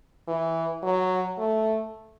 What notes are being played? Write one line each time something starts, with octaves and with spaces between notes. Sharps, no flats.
E3
F#3
A3